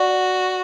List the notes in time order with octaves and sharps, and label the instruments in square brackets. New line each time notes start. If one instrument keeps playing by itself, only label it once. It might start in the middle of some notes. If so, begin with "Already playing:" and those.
Already playing: [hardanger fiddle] F#4 [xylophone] D5